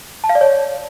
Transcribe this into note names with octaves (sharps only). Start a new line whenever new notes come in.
A5
F5
D5
C#5